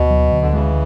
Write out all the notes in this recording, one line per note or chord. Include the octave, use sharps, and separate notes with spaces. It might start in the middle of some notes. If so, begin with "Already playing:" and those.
Already playing: D2 B2
F#3
D2
D3
C#3 E3 G#3